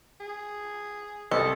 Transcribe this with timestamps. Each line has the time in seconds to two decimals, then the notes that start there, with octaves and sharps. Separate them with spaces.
0.20 G#4
1.31 C2 A4 D#5